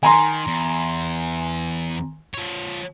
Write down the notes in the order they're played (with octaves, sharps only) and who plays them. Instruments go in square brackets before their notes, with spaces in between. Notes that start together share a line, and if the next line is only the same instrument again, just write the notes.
[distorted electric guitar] D#3 [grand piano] G#5 A#5 C6
[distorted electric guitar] E2
F3 C#5